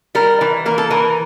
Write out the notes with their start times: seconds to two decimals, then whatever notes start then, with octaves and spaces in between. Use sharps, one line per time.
0.15 G3 A#4
0.41 E3
0.66 A#3 A#4
0.78 A4
0.90 E3 A#4